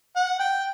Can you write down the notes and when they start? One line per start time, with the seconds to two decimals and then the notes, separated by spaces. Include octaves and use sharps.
0.16 F#5
0.39 G5